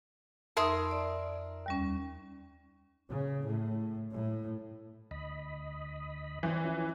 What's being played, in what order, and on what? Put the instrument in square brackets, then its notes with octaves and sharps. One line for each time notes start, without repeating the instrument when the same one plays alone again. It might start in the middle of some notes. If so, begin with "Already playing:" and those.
[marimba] F2 D#4 D#6 [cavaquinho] A#4 E5 C6
[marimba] D5
D#2 G3 C#4
[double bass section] C#3
A2
A2
[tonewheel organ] D2 D#5 B5
[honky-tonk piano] E3 [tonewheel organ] C5 D5 G5
[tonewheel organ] F3 C#4 E4